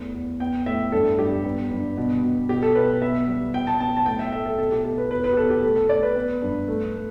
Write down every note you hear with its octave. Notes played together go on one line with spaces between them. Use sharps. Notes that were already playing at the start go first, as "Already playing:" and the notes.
Already playing: E2 A3
E2
B3 G5
A2 E5
G2 A4
G2 G4
B3
G2
B2
B2
B2 G4
A4
B2 B4
B3 E5
G3
B2 G5
A5
B3 A5
A5
A2 G5
E5
A3 E5
A4
B2 A4
G4
B2 A4
B4
E2 B4
B4
G4
B2 A4
G4
A3 A4
A4
A3 D5
B4
B3
G2
A3
A3